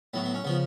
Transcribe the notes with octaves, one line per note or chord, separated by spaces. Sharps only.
A2 F#3 B3
B3
C#4
C#3 F3 B3